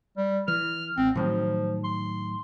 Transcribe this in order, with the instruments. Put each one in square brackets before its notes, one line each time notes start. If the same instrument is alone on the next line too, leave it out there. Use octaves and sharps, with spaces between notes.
[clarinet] G3
[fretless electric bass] E3 [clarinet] F6
[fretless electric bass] G#1 [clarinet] C4
[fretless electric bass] A2 D#3 F#3 [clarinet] F3
[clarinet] C6